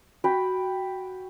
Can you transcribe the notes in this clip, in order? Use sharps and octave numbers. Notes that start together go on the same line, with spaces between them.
F#4 G5 B5